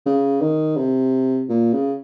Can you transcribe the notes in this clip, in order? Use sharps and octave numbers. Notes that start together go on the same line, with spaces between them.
C#3
D#3
C3
A#2
C#3